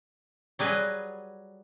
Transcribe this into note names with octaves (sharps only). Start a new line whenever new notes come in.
F#3 G3 G#4 B4 D#5